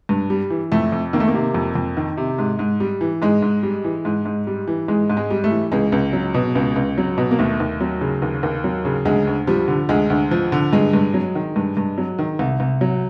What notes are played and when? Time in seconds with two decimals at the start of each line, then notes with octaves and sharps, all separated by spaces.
0.09 G2
0.30 G3
0.50 E3
0.72 F2 A3
0.92 F2
1.13 D#3 A#3
1.20 A3
1.28 A#3
1.34 C3
1.54 F2
1.75 F2
1.97 D#3
2.17 C3
2.39 G#2
2.59 G#2
2.80 G3
3.01 E3
3.22 G#2 G#3
3.42 G#2
3.63 G3
3.84 E3
4.05 G#2
4.25 G#2
4.47 G3
4.68 E3
4.88 G#2 G#3
5.10 G#2
5.17 G#3
5.31 G3
5.44 A3
5.51 E3
5.72 C#2 G#3
5.92 C#2
6.13 F#3
6.34 B2
6.55 C#2
6.76 C#2
6.98 F#3
7.18 B2
7.31 A#3
7.39 D#2 A3
7.60 D#2
7.81 F#3
8.01 C#3
8.22 D#2
8.43 D#2
8.64 F#3
8.85 C#3
9.05 D2 G#3
9.27 D2
9.47 F3 G3
9.68 D3
9.89 D2 G#3
10.10 D2
10.31 F3
10.52 D3
10.73 G2 G#3
10.93 G2
11.14 F#3
11.35 D#3
11.56 G2
11.77 G2
11.98 F#3
12.19 D#3
12.39 C2
12.60 C2
12.81 F#3